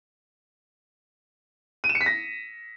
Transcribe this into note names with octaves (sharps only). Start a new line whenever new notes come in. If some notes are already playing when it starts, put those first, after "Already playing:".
D#7
E7
C#7
B6
A#6